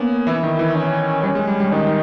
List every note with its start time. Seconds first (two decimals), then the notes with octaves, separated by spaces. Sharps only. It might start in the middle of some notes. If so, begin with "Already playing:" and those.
Already playing: A#3 B3 C#4
0.27 E3 E4
0.43 D#3
0.59 E3
0.75 C#4
1.23 G3 C#4
1.35 G#3
1.47 G3
1.60 G3
1.72 D#3 D#4